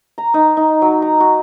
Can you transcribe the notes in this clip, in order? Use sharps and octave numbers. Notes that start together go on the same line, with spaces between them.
A#5
D#4
D#4
F#3
A#5
F#4